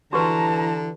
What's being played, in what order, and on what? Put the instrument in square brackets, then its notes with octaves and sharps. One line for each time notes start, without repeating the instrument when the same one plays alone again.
[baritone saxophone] D3 [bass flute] E3 [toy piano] F#4 G4 B4 [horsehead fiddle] A5 A#5